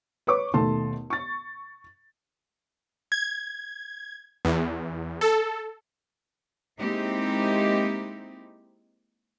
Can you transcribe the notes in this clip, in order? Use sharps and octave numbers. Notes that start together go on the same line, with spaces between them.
B4 C#5 C#6 D6
D#2 B2 A3 A5 C6
C#6 A6
G#6
E2
A4
G#3 A#3 C4 D#4 E4 G4